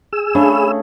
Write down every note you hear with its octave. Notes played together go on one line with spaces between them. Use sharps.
G#4 E6
C#3 A3 D4 B5